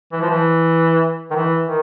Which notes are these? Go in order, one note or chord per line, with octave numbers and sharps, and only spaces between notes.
E3
F3
E3
D#3
E3
D#3